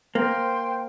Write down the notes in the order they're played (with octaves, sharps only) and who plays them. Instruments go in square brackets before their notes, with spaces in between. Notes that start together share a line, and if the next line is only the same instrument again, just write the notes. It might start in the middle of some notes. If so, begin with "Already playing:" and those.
[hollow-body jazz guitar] A#3 [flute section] C5 G5 C6